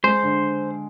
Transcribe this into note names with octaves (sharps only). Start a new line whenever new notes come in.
G#3 C5
D3